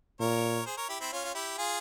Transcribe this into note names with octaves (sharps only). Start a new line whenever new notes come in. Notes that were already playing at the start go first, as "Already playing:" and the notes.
A#2 A#4 C#5
G#4 C5
A#4 C#5
E4 G4
C4 E4
C#4 F4
F4
E4 G4
F4 G#4